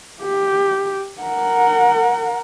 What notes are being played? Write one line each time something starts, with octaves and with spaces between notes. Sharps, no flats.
G4
A#4 F#5